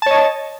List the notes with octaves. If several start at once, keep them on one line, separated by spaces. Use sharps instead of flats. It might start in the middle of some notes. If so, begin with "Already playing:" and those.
C#5 D#5 A5